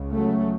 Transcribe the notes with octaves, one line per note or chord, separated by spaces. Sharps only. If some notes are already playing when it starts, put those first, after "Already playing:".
Already playing: C#2 C#3
F#3 A3